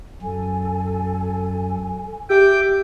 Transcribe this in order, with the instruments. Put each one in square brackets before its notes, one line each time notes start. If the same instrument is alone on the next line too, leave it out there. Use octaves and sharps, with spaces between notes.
[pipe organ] F#2 [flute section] A4 G#5
[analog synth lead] G4 [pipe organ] E5 D6 [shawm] G5